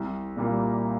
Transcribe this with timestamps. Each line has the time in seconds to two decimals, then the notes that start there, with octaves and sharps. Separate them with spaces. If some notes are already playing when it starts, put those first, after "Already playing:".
Already playing: C2
0.36 A#2 G3 A#3 F4